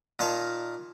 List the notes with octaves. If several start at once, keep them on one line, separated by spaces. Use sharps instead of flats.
A#2 D#3 F5 A5